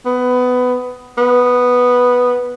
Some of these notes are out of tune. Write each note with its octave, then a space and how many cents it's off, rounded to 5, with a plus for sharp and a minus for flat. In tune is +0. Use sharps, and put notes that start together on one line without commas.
B3 +15
B3 +0